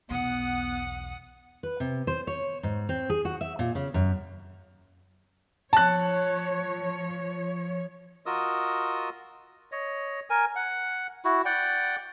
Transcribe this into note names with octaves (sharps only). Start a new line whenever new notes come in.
B1 E2 B3 F#5 D#6
B4
C3
C5
C#5
G#2
C4
G#4
F#4
E5
A#2
C#3
F#2
F3 C#5 A5 F#6
F4 F#4 A#4 D#5 D#6 E6
C#5 D#5
A#4 G#5
F#5
E4 F#4
D5 F#5 G5